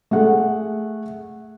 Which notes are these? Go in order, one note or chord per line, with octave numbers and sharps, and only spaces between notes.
A3 G#4 F#5